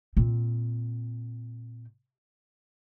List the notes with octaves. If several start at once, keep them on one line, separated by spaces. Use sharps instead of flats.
A#2 C4